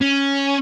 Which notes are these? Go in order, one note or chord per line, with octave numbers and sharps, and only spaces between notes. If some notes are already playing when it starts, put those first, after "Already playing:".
C#4